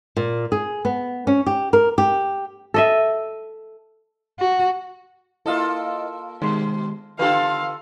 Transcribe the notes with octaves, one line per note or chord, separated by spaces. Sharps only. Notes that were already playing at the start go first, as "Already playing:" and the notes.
A#2
G#4
B3
C#4
G4
A#4
G4
A4 D#5 E5
F#4
A#3 E4 F4 A4 D#5 F5
B2 D#3 G#3 C6
D3 F4 G4 A4 B4 F5